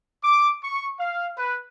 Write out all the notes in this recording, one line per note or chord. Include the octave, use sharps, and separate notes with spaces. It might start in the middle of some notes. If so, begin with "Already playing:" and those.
D6
C#6
F5
B4